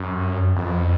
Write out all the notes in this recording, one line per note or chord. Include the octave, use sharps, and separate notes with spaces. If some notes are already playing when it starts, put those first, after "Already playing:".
Already playing: F#2
F2